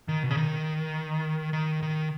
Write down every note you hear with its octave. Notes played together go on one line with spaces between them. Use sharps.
D#3
B2
C#3
D#3
D#3
D#3